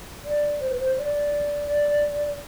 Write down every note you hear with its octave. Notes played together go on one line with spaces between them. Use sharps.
D5
C5
B4
C5
D5